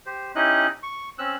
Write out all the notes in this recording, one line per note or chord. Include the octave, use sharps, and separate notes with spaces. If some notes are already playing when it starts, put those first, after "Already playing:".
G4 C5
C#4 D#4 E4 G4 D#5 F#6
C#6
C4 C#4 E6 F#6